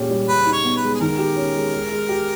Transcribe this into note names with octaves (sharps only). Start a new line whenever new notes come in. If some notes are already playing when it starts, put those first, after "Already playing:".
Already playing: A#2 G#3 C#4 G4
G3
C#3 B4
D#4
C#5
B3
B4
G#3
G#4
D#3 A#4
G4
C#4
G#3
G#3
G#3
G4